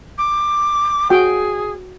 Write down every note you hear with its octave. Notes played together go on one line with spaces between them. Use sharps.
D6
F#4 G#4 G5